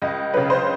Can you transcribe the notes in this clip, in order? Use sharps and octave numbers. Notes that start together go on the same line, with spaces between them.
C#2 D#5
C#3 F#3 B4
C5